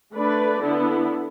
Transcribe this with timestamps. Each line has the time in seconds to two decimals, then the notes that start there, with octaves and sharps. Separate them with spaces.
0.14 A3 D4 B4 D5
0.61 D3 B3 E4